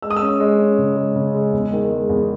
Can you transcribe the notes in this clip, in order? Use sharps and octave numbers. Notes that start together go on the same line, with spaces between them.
G#3 E6
D#6
E6
C#4
G#3
C#4
C#3
G#3
C#3
G#3
E2
D#3
G#3
E2